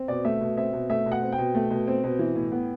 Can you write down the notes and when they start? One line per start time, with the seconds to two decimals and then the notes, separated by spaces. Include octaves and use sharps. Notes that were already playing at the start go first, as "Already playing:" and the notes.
Already playing: C4
0.08 B2 D5
0.25 A3 E5
0.41 B2
0.57 C4 E5
0.73 B2
0.90 A3 E5
1.06 B2
1.12 F#5
1.22 C4
1.33 G5
1.38 B2
1.55 A3
1.71 B2
1.87 C4
2.04 B2
2.19 E3
2.36 A2
2.52 B3